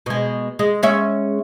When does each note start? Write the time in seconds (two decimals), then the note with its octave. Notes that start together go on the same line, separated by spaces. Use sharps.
0.06 B2 G#3
0.59 G#3
0.83 G#3 C#4 E5